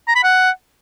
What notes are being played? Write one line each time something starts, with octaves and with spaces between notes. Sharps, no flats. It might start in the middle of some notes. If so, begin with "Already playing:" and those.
A#5
B5
F#5